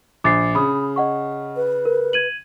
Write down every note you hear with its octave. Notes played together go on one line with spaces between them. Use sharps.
A#1 D6 A6 C7
C#3 B5 D#6
D#5 F#5 C#6
B4
A#4
G#6 D#7 F#7